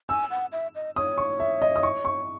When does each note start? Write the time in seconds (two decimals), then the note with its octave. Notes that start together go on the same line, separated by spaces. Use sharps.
0.09 G#5 E6
0.31 F#5
0.52 E5
0.75 D#5
0.96 C#5 D#6
1.18 C#6
1.40 E5
1.62 D#5
1.76 D#6
1.83 C#6
2.05 C#6